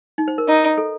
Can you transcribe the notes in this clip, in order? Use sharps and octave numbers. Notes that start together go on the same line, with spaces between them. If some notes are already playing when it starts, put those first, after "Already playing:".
D#4
C5
A#4
D#4
A4